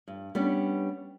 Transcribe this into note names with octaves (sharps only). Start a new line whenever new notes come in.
G2
G3 B3 C#4 D4